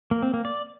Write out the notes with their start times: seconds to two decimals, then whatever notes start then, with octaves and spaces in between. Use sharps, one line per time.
0.11 A#3
0.22 C4
0.34 A#3
0.45 D5